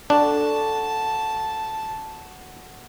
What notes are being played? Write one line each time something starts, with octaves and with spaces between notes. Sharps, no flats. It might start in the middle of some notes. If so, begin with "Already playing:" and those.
D4 F#4 A4 A5